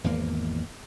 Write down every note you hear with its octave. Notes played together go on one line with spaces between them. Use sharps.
G#1 E2 A#3